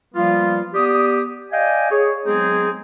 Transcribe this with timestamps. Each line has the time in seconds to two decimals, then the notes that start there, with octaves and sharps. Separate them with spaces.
0.15 F3 G3 A#3 B3 F4
0.74 B3 G4 D5 D#6
1.52 D5 D#5 F5 G5 G#5
1.91 G#4 C#5
2.26 F#3 G#3 B3 C4 D#4 G#4